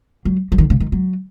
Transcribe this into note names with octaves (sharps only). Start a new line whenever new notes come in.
F#3
F#3
D#3
C#3
D#3
F#3